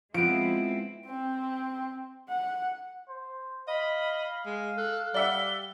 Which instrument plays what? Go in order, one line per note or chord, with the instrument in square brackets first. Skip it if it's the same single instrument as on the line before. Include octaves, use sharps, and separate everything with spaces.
[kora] F3 B3 [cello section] G#3 C4 E4 [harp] D7
[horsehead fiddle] C4
F#5
[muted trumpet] C5
[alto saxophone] D#5 [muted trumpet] F5 [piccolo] B5
[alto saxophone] G#3
[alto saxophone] A4 [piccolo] F#6
[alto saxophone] G3 [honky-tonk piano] D5 E5 F#5 [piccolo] G7